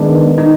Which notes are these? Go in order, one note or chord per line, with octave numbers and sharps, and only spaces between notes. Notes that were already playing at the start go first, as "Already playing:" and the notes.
Already playing: D#3 G#3 B3 D4
D#4